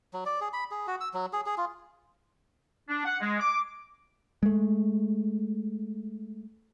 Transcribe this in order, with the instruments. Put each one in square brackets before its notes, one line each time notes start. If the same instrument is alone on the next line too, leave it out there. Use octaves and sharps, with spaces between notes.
[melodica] F#3
D5
G#4
B5
G#4
F#4
E6
F#3
G#4
G#4
F4
[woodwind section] D4
F#5
G#3
D6
[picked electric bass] G#3 A3